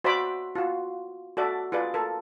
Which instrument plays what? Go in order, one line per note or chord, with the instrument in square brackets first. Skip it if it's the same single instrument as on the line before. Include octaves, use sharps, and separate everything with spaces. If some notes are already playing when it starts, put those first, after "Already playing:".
[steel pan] F#4 C5 D5 E5 B5 D6
F4 F#4
F#4 A4 D5 E5
F4 G#4 B4 D5
A4 A#4